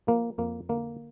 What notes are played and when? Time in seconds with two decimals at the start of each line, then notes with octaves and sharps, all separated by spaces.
0.07 F3 A#3
0.38 F2 A#3
0.69 D3 A#3